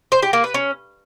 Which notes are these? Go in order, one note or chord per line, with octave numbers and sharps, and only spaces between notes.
C5
G4
A#3
B4
C#4